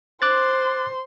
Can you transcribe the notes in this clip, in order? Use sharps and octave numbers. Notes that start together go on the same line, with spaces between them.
C5 C6 D6 F#6 A6